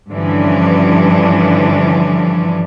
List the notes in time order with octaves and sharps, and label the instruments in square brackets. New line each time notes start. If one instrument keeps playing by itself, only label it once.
[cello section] G2 D3 E3 F3 C#4 D4